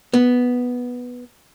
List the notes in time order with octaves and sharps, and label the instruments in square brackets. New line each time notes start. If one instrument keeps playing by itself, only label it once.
[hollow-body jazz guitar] B3